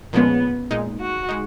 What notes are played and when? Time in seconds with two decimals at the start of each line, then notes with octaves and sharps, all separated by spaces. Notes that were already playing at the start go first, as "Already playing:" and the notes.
0.13 A#2 F3 G#3 B3 C#4
0.71 A#2 G#3 D#4
1.00 F#4
1.29 G#3 D#4